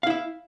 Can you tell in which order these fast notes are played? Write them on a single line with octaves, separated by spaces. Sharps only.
F5 E4 E5